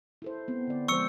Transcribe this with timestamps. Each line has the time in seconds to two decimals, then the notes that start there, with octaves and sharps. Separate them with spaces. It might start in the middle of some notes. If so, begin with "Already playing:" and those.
0.22 E4 A4 C5
0.48 B3 C4
0.67 D3 D5
0.88 F3 G#3 C5 C#6 E6 C#7